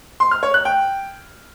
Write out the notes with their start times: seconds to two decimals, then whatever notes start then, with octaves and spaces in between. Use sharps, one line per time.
0.20 C6
0.31 F6
0.43 C#5
0.54 F#6
0.65 G5